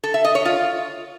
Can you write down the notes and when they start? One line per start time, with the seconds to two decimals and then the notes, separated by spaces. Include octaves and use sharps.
0.04 A4
0.14 E5
0.24 D#5
0.35 C#5
0.45 F4